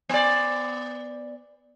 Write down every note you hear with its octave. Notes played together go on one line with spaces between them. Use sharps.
B3 D5